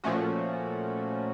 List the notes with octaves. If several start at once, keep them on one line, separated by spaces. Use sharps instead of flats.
A#2 F3 A3 C#4 F#4